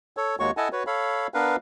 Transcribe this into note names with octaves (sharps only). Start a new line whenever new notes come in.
A4 C#5
D#2 G#3 A#3 F#4 C#5 C#6
E4 A4 D#5 F#5 G#5 A5
F#4 B4 C#5
A4 C#5 F5 B5
B3 D4 A#4 B4 F5